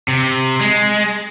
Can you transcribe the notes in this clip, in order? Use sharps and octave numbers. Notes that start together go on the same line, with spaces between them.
C3
G#3